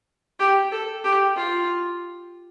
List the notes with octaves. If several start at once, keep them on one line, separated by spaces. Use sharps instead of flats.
G4
A4
G4
F4